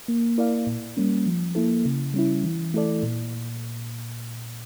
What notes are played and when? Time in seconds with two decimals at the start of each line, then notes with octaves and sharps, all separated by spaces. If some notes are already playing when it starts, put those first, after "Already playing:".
0.08 A#3
0.38 E4 A#4 D5 F5
0.67 A#2
0.97 G3 A#3 C#4
1.26 F3
1.55 A#3 E4 A4
1.85 C#3
2.14 G3 C#4 E4
2.44 E3
2.74 A3 E4 A4 D5
3.03 A#2